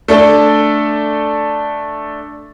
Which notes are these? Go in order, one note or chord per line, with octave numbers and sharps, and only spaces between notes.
A3 D4 A4